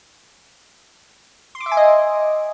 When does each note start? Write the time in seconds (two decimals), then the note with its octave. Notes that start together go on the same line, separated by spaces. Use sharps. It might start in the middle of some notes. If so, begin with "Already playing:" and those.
1.55 C6
1.60 D6
1.66 E5
1.71 G#5
1.77 D#5